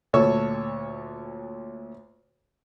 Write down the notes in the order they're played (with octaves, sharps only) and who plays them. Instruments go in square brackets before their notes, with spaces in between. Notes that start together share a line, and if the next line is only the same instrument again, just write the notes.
[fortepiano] D2 A#2 A4 C#5 E6